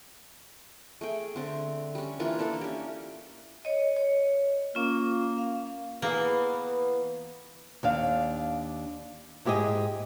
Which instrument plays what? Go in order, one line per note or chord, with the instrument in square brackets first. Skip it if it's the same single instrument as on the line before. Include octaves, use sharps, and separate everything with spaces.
[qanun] A3 G#4 G5
D3 C4
G3 C#4
E3 A#3 D4 F4
A#3 D4 E4 A4
C#4 G4
[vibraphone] C#5 D#5
C#5
[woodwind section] A#3 [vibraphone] C#4 F4
[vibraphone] F5
[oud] E3 G#4 [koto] A#3 [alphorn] B3
[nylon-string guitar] D#2 D4 F5
G#2 E4 G4 G#4 D#5